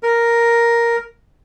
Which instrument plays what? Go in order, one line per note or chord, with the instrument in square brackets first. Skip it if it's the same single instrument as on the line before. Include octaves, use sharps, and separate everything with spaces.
[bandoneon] A#4